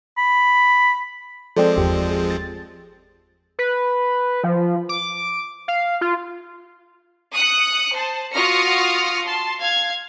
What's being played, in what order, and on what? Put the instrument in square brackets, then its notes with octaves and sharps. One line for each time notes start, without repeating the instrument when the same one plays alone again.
[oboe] B5
[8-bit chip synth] F3 G#3 C4 [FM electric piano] A4 D5 G5
[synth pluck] G1 E2 G4
[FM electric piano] G#4
A6
[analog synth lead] B4
F3
D6
F5
F4
[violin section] D#6 F#6 C#7
C5 A5
F4 F#4 D#6 F6 A#6 C#7
A5 C6
F5 G#6